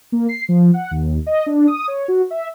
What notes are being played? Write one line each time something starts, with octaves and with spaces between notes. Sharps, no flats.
A#3
C7
F3
F#5
D#2
D#5
D4
D#6
C#5
F#4
E5